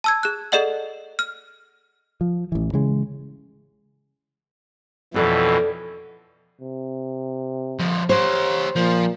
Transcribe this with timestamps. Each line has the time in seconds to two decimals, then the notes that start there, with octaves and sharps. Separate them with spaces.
0.04 A5 E6 G#6
0.23 G#4 F#6
0.52 G#4 A4 D5 D#5 F#5 F#7
1.19 F6
2.21 F3
2.52 A1 E3
2.73 C#3 E3 G#3
5.14 F2 B2 E3 C#4 A4 D5
6.61 C3
7.79 D3 F3
8.09 G4 C5 C#5
8.76 A#2 F3